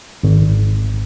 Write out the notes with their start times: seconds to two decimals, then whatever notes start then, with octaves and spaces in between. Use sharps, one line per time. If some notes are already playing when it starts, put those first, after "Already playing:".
0.23 G#1